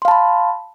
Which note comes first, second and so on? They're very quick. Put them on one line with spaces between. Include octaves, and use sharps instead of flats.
C6 F5 A5 B5